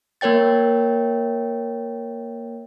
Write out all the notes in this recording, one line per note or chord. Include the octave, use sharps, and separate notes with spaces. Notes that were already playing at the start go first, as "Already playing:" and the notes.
A#3 A#4 C#5 G5 A6